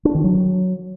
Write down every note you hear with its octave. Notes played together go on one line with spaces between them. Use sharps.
D4
D#3
F#3